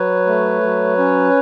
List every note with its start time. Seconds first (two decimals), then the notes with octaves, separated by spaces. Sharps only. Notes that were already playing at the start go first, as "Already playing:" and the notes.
Already playing: F#3 B4 C#5
0.27 A3
0.62 F#3
0.98 C#4